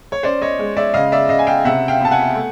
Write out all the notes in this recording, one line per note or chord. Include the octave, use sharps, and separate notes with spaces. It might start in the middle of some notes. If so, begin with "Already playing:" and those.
C#5
C#4 C5 D5
C#5 D#5
G#3
D5 E5
C#3 D#5 F5
D5 E5
C#3 D#5 F5
G#5
F5 G5
C3 E5 F#5
F5 G5
B3 A5
F#5 G#5
A3